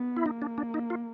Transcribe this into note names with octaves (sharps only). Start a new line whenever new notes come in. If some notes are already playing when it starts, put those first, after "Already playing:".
Already playing: B3
E4
A#3 D#4
D4
D4
D#4
F4